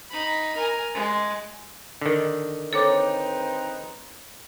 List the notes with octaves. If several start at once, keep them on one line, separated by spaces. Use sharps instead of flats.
D#4 B5
A#4 G#5
G#3
D3 D#3
C4 D#4 A4 B4 C#5 D6